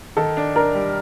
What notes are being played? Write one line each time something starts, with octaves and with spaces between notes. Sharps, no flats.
D#3 A4
D4
D4 A#4
G3